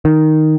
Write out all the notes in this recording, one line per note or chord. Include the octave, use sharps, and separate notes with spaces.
D#3